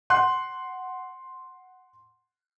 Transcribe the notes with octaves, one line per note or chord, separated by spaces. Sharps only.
F#5 C6 F#6